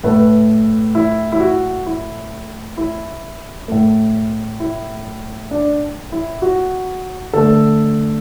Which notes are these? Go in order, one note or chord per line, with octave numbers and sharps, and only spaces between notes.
A2 A3 B4
E4
E4
F#4
E4
E4
A2 A3
E4
D4
E4
F#4
D3 A3 A4